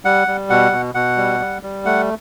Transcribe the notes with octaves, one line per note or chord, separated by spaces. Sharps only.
G3 F#5
G3
B2 F#5
B2
B2 F#5
G3
G3
G3
A3 F#5